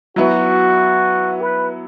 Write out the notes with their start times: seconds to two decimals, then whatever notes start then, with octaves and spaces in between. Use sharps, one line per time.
0.16 F#3 B3 E4 F#4
1.42 B4